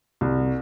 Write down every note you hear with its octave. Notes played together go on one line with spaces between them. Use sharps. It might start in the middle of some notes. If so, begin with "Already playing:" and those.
C2